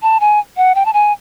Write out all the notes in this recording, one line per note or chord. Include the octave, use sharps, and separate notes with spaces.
A5
G#5
F#5
G5
A5
G#5